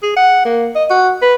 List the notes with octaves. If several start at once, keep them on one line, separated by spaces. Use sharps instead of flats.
G#4
F#5
A#3
D#5
F#4
B4